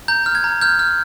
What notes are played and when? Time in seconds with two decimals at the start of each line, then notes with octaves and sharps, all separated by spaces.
0.08 A#5 G6
0.26 F6
0.35 G#6
0.44 A#5
0.61 F6 G6
0.79 F6